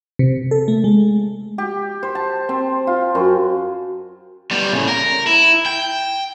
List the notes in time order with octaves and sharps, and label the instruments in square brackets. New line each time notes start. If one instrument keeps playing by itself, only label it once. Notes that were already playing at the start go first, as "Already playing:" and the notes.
[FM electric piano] C3
A4
A3
G#3
[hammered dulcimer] G4
C5
A5
C4
F4
F#2
[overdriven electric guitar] G3 B3
A2 C#3
A#4
E4
G5